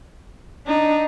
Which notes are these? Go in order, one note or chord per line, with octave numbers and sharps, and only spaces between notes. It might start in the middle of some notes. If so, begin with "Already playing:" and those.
D4 D#4